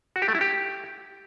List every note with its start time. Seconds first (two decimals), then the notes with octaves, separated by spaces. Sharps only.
0.16 F#4
0.22 G4
0.28 A3
0.35 E4
0.41 G4